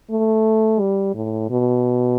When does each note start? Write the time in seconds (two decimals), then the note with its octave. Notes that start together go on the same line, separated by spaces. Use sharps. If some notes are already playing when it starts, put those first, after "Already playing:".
0.10 A3
0.80 G3
1.15 A2
1.50 B2